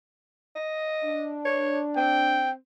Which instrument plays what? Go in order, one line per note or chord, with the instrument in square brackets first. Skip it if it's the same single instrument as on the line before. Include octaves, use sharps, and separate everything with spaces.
[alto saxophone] D#5
[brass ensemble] D4
[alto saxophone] C#5
[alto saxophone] C4 [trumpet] G5